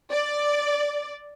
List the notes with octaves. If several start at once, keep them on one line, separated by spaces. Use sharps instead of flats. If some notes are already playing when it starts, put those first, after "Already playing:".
D5